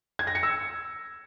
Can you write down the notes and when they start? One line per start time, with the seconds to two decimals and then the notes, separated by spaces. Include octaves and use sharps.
0.19 G#6
0.27 A#6
0.35 C#7
0.43 E6